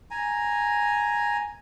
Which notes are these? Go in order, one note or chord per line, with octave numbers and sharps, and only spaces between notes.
G#5 A#5